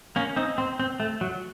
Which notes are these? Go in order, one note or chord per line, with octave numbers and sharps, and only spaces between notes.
A#3 C#4
C4 D#4
C4
C4
A3
F#3